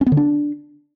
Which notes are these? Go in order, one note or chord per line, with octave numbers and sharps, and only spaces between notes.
C#4
B3
D3
D4